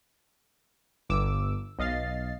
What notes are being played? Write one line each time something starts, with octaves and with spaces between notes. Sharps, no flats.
G1 D6 E6
B1 D#5 F5 A6 C7